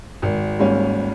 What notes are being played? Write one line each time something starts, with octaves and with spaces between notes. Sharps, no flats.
G#1
G#2 G3 A#3 C#4